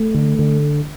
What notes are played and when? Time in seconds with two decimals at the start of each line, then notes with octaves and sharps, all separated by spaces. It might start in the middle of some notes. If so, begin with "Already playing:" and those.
Already playing: A3
0.14 D3
0.39 D3